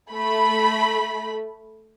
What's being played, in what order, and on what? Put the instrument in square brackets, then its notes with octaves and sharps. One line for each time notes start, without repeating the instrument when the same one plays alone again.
[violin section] A3 B5